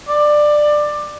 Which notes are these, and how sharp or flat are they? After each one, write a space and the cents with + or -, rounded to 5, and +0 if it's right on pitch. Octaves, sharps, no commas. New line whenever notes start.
D5 +15